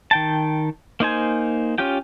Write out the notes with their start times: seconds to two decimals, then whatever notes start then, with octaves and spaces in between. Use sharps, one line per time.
0.11 D#3 G5 A5
1.00 A#3 D#4 C5 G#5
1.78 C#4 F4 G4 G5